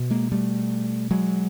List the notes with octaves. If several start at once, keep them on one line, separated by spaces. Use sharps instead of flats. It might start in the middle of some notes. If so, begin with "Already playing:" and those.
Already playing: B2
G#3 A#3
G3 A3
F#3 G#3